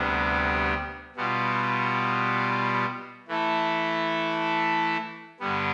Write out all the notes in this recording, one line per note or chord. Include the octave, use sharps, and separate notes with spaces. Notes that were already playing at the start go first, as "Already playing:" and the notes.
Already playing: D2 C3 G3 B3 D4
B2 G3 B3 F4
E3 A3 E4 A4
G2 D3 G3 B3